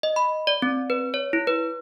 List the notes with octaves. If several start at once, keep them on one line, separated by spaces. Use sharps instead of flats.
D#5
B5
D5
C4
B4
C#5
E4
B4